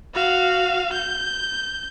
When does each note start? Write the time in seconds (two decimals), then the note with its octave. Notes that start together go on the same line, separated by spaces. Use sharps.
0.14 F#4 F5
0.93 G6